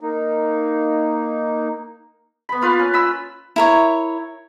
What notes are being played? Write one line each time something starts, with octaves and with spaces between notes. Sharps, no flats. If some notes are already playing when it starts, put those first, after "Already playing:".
A#3 D#4
B3 B5
A#3 F4 B4
C#4
B5 E6
E4 A#4 C#5